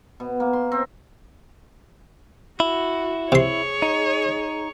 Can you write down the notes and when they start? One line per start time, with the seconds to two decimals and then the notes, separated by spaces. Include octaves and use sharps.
0.20 B2
0.40 A#3
0.53 C6
0.72 C4
2.60 E4 F#4
3.32 C3 G#4 C#5 C6
3.82 D#4